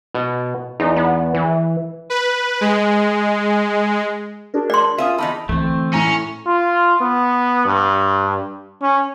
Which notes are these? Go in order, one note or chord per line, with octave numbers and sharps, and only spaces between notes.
B2
E2 D#4
B3
E3
B4
G#3
D4 F#4 G#4 A#4
D5 C6
C#4 F4 E5 D#6 D#7
E2 D#3 D#4 A5 B5
D3 E3 A3 C4
A2 C#4 A#5 A#6
F4
B3
G2
C#4